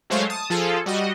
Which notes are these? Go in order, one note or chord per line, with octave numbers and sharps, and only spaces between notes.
F#3 G#3 A3 C5 C#5 F5
A5 D#6
F3 F4 G#4 A4
G3 F#4 D#5